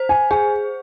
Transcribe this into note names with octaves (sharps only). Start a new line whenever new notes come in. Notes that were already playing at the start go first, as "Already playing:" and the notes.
Already playing: C5
G#5
G#4 G#5